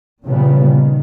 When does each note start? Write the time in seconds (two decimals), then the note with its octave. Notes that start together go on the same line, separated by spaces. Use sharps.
0.23 A#2 C#3 E3 F3 G3 B3
0.62 D#3